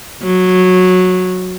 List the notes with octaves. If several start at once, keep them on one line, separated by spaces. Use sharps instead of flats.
F#3